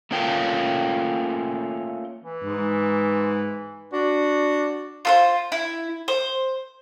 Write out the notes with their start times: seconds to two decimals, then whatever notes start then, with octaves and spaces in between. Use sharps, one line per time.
0.11 A3 A#3 C#4 F4 A#4 G5
2.23 E3
2.44 G#2
3.92 D4 F#4
5.05 F4 A4 C5
5.52 E4
6.08 C5